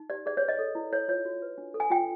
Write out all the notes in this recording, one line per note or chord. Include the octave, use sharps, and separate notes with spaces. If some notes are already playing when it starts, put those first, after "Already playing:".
Already playing: D#4
G4 D5
G#4 D5
C#5
B4
D#5
A4
E4
A4 C#5
F4 C#5
F#4
B4
D4
A4
G#5
F4 G5